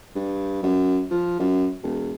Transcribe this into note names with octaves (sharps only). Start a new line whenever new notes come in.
G2
F#2
F3
F#2
E1